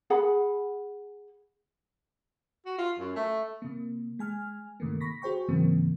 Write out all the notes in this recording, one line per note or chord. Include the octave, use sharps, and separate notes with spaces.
G#4 F#5 B5
F#4
F4
F#2
A3
C3 A#3
G#3 G#5 F6
G2 C3 D#3 A3 A#3
B5 C#6 A#6 B6
F#4 G#4 C5 G5 C#6
G#2 C#3 E3 F#3 A#3 C4